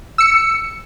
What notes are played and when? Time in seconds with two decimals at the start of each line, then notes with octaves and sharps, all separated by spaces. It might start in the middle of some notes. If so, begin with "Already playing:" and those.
0.18 E6 C#7